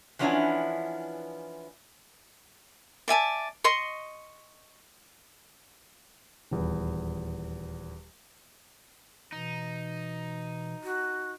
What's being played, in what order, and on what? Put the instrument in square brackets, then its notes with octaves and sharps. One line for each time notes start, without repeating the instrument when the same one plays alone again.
[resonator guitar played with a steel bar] E3 F3 B3 C#4 D4 E4
[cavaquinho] D5 E5 G#5 A5
D#5 C6 C#6
[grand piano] D#1 E2 B4
[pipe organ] B2 E3 [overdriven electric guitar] D#4
[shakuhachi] F#4